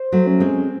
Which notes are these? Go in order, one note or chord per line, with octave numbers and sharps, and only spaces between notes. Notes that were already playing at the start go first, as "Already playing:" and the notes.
Already playing: C5
F#3 A3
C#4
G#3 C4